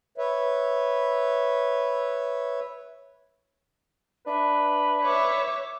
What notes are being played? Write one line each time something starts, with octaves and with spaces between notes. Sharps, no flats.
B4 C#5 E5
D4 B4 E5
C#5 E5 D6